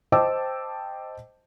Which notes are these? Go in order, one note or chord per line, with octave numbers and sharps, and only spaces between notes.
C5 D#5 G5 A5 D6 E6